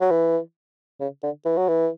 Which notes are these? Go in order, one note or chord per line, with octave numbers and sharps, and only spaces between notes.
F#3
E3
C#3
D3
E3
F#3
E3